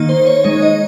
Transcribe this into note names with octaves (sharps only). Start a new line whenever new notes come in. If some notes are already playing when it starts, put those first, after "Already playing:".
Already playing: D#3 A#3 D#4
C5
C#5
G#3 D#4 C#5
D#5